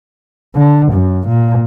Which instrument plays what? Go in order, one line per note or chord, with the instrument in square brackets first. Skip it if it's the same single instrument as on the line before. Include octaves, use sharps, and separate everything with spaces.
[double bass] D3
F#2
A#2